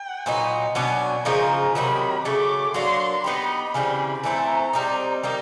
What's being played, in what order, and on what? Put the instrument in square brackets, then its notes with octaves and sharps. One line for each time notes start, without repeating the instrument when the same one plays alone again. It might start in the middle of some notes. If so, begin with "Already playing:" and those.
Already playing: [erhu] G5
[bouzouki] A#2 F#3 B3 D#4
[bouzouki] B2 F#3 B3 D4 [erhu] G#5
[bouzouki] C#3 F3 A#3 D#4 [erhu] A#5
[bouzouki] C3 D#3 F#3 [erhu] B5
[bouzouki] C#3 F#3 A3 [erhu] D6
[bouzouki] F#3 A#3 D4 [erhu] C6
[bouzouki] B3 D#4 G4 [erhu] B5
[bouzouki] C#3 E3 G3 C4 [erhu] B5
[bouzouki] E3 A3 C4 E4 [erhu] A#5
[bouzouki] G3 C4 D#4
G3 A#3 D#4